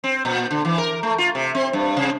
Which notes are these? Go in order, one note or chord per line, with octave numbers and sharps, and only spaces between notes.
C4
A#2
D3
E3
A#4
A3
F4
C3
C4
G2
C3